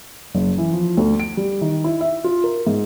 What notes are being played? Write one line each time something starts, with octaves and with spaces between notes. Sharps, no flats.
F#1
E3
F3
D2
D7
G3
D#3
E4
E5
F4
A#4
G#2